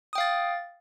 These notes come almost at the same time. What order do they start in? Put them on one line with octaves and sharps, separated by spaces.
D#6 G5 F5 A6